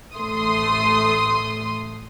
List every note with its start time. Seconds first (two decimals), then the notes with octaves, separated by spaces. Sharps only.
0.17 A1 A3 C6 D#6